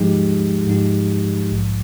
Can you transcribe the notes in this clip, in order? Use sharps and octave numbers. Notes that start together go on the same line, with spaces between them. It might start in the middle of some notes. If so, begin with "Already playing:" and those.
Already playing: G#2 F3 G#3 D#4 G4
G#2 F3 G#3 D#4 G4
A#1 G#2 F3